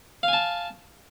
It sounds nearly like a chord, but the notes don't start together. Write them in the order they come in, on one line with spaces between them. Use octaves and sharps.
F5 G#5 A5